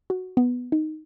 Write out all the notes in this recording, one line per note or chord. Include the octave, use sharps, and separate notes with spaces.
F#4
B3
D#4